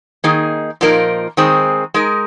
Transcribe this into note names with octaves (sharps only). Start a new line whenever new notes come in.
D#3 A#3 D#4 G#4
A#2 F3 A#3 D#4 A#4
D#3 G#3 C4 G#4
G#3 D#4 A#4